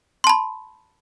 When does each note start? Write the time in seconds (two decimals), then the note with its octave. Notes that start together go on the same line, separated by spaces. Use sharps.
0.24 C6
0.27 A5
0.29 B5